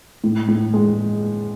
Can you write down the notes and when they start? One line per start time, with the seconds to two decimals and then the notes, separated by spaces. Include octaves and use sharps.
0.24 A2
0.48 A2
0.74 G#3